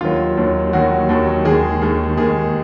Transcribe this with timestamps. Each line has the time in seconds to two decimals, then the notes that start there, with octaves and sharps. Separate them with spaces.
0.01 D#2 D#3 F#3 F4
0.37 D#2 D#3 F#3
0.73 D#2 D#3 F#3 F#4
1.09 D#2 D#3 F#3
1.45 D#2 D#3 G#3 G#4
1.81 D#2 D#3 G#3
2.17 D#2 D#3 G#3 G#4